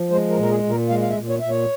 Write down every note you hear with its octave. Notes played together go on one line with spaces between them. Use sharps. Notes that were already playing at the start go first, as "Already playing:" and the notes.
Already playing: F3
G#3 C5
A#4
A#2
A#4
G#4
A#2
A#4
G#3 F5
F5
E5
A#2
C#5
A#2 E5
C#5